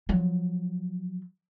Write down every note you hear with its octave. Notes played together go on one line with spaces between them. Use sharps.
F3 F#3